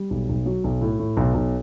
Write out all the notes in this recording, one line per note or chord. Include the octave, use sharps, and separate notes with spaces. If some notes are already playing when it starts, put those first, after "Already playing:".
Already playing: G3
B1
B1
F#3
B1
A2
A2
B1
B1